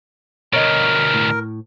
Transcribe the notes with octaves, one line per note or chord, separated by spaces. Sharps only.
D2 B2 A#4 C#5 D#5
A2